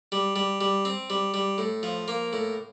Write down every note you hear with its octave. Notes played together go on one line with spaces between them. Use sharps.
G3
G3
G3
C4
G3
G3
A2
F3
A#3
A2